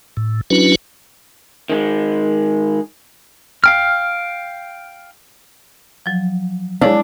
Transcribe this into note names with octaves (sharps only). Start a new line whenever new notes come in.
A2
F#3 C#4 D4 E4 F#4 B4
D#3 G#3
F5 G5 F6
F3 F#3
G#3 D4 E4 G#4 C#5 F5